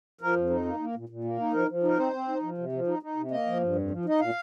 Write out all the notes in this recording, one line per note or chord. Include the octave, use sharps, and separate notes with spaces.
F3 A#4
F2
D#4
A#3
A#3
A#2
A#2
A#3
D#4
F3 A#4
F3
D#4 A#4
C4 C5
C4
D#4
F3
C3
F3
D#4
D#4
C3
A#3 D#5
F3
G2
F2
F3
D#4 D#5
A#2 F5